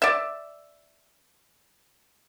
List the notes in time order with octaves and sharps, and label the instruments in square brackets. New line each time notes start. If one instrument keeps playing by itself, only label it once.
[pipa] D5 E5